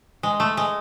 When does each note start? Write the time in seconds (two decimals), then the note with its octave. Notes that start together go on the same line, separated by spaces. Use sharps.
0.23 G#3
0.40 A3
0.57 G#3